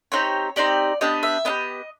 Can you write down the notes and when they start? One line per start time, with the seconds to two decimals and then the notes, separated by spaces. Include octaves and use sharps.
0.12 C4 D#4 G4 C#5
0.56 C4 D#4 G4 D5
1.01 B3 D4 G4 D#5
1.23 E5
1.45 B3 D4 G4 D#5